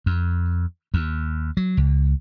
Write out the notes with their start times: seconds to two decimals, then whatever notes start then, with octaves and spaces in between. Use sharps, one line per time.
0.06 F2
0.94 D#2
1.57 F#3
1.77 C#2